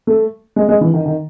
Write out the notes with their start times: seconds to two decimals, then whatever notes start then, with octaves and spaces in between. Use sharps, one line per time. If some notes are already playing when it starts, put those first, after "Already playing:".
0.07 A3
0.56 G#3
0.69 G#3
0.81 E3
0.94 D#3
1.06 D#3